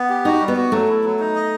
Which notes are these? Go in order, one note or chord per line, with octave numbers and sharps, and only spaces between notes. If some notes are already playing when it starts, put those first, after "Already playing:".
Already playing: B3
G4
D#4 F#4
G3
B3
F#4
F#3 A3
E4
F#3
D#4
D#5